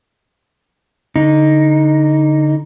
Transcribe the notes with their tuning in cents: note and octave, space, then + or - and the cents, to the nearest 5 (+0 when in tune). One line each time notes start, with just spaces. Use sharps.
D3 -20 D#4 +0